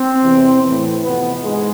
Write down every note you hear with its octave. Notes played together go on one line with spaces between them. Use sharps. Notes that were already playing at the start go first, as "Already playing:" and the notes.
Already playing: C4
E2 C3 E3
A2 E3
F2 C3 E3 B3
G#2 G#3